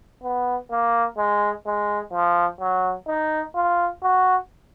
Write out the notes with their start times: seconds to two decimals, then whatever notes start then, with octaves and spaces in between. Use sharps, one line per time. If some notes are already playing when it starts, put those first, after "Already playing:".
0.23 B3
0.71 A#3
1.18 G#3
1.66 G#3
2.13 F3
2.60 F#3
3.08 D#4
3.55 F4
4.03 F#4